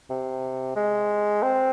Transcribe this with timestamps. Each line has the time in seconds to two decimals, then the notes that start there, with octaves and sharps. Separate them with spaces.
0.10 C3
0.76 G#3
1.43 C4